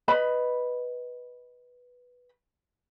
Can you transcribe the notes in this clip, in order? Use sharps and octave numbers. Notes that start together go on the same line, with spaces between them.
B4 D#5 B5